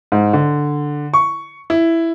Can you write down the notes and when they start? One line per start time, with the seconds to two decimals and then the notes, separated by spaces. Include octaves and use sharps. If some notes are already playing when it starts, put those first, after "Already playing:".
0.12 G#2
0.33 D3
1.14 C#6
1.70 E4